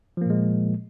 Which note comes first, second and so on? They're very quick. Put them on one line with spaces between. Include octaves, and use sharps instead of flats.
F3 A#3 A#2 G#3